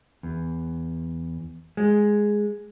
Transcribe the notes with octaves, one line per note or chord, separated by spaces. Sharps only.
E2
G#3